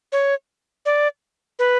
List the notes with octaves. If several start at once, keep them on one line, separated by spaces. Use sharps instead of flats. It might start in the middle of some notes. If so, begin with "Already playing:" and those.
C#5
D5
B4